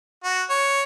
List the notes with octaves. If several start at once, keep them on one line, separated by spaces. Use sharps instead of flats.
F#4
C#5